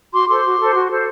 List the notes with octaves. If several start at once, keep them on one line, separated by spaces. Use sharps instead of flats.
F#4 C6 D6
A4 C5 C6 D6
F#4
A4 C5
F#4
A4 C5